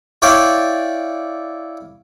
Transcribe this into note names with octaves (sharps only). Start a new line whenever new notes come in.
E4 C#5 D5 F5 G5